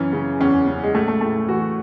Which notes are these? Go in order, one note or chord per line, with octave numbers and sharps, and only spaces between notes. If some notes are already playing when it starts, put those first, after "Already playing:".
Already playing: F#2 E3 C#4
C#3
E2 C#4
C#3
G#3
A2 A3
A3
A2 A3
E3 F#4